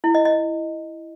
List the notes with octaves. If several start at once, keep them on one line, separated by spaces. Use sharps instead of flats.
E4
D#5
D#5